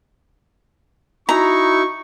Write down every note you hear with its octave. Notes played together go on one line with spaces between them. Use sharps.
D#4 E4 F#4 A#5 C#6